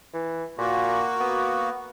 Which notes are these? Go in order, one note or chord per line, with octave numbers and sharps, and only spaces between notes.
E3
A#2 A#3 F#4
B3